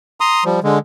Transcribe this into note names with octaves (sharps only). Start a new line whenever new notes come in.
A#5 C6 D#6
F3 G3
D3 G#3